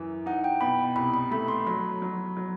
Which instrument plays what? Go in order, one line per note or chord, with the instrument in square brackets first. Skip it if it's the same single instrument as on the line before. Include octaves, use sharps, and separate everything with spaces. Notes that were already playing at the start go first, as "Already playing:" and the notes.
Already playing: [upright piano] F#2 E3
[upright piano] D#4 [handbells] F#5
[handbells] G5
[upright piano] B2 [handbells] B5
[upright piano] C2 [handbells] B5
[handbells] B5
[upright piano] A3 [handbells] B5
[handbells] C6
[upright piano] F#3 [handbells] B5
[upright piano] F#3
F#3